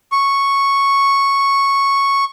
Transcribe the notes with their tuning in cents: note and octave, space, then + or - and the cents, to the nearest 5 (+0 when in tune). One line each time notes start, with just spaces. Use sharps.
C#6 -5